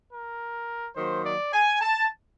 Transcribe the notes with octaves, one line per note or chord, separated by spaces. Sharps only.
A#4
D#3 F#3 A#3 C5
D5
G#5
A5